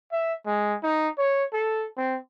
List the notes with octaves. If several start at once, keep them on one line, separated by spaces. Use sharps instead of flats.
E5
G#3
D#4
C#5
A4
C4